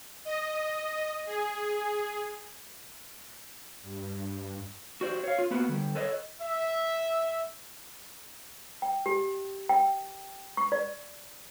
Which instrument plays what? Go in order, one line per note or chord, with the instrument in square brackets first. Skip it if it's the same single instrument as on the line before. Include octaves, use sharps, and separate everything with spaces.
[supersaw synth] D#5
G#4
[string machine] G2
[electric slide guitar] F#4 G4 C5 D5
C#5 F5
F4
A#3 B3 F#4 B4
D3 G3
A4 B4 C#5 D#5
[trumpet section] E5
[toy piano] G5
G4
G5
C#6
D5